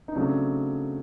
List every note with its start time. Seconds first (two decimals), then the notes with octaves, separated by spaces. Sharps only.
0.08 D#4
0.15 C#3 F#3 A3 C4 D4